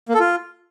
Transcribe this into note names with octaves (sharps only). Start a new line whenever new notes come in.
A#3
A4
F4